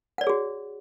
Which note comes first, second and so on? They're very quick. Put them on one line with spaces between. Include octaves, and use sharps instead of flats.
F#5 D5 C#5 G#4 F#4